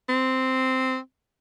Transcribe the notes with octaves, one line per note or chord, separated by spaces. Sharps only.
C4